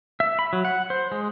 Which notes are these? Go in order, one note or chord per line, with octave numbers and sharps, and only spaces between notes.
E5
B5
F#3
F#5
C5
G#3